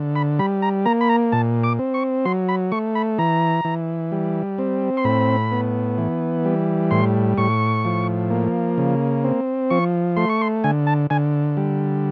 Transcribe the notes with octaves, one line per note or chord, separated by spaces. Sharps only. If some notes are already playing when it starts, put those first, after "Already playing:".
Already playing: D3
B5
G3 B5
A#5
A#3 A#5
B5
A#5
A#2 A5
D6
C4
C#6
F#3 C6
B5
A3 C#6
B5
E3 A#5
E3
G3
C4
C6
A2 B5
B3
E3
G3
A2 C6
A2 C#6
F3
A#3
C#3
C4
F3 C#6
A3 C6
C#6
C6
D3 G#5
A5
D3 G#5
G3